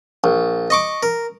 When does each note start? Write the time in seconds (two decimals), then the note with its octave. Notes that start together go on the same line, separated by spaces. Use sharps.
0.24 A#1
0.70 D#5 C#6 D6
1.03 A#4